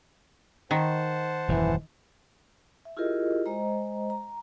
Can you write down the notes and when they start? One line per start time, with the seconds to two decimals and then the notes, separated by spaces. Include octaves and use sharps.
0.71 D#3 C5 F#5 A5
1.48 D#1 F#2 E3
2.85 E5
2.97 E4 F4 G4 G#4 A#4 D#5
3.46 G#3 C5 D#5 A#5
4.10 A#5